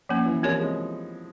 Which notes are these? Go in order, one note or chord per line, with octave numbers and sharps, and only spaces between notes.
F3 A#3 C#4
E3
F3 C4 G4 A#4 C#5
G#3